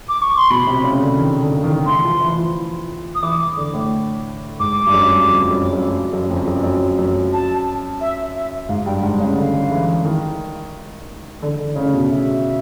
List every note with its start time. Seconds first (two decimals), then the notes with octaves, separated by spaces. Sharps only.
0.09 D6
0.22 C#6
0.36 C6
0.50 B2 B5
0.67 C3
0.84 C#3
1.01 D3
1.19 D#3
1.42 D3
1.64 D#3
1.86 E3 C6
2.04 F3
2.20 E3
2.38 F3
3.15 D#6
3.23 E3 D6
3.57 D3
3.74 A2
4.59 G#2 D6
4.87 G2
4.94 F#2
5.28 F2
5.50 F#2
5.73 F#2
6.13 F#2
6.30 F2
6.47 F#2
6.64 F#2
6.98 F#2
7.33 A5
8.01 E5
8.34 E5
8.68 G#2 F5
8.86 G2 G5
9.02 G#2 F#5
9.20 C#3 F5
9.38 D3 F5
9.54 D3
9.71 E3
9.89 E3
10.05 D#3
11.42 D3
11.59 D3
11.76 C#3
11.93 B2
12.10 E5